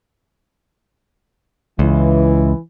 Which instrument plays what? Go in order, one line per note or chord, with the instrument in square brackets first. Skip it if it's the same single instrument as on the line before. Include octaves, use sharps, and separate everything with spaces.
[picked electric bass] C#2 [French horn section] E3